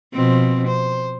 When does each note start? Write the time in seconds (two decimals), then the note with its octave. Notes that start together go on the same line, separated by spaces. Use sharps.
0.14 B2 F3 C4
0.68 C5